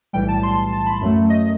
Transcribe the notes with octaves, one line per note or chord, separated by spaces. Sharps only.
B1 A2 E3 G3 G5
A5
C6
A5
B5
F#2 F#3 A3
D#5